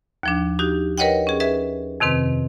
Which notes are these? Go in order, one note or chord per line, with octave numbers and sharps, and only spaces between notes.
D#2 F3 D4
D#4 F#4 G4
A#4 B4 C#5 D#5 F#5 G5
C#4 G#4
G#4 B4 E5
F2 C3 D#3 C4 B4